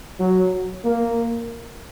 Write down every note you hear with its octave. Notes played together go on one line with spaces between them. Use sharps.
F#3
A#3